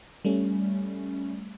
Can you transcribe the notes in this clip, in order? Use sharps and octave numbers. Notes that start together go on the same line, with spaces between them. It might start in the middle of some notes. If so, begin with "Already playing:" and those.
G3 A3 C#4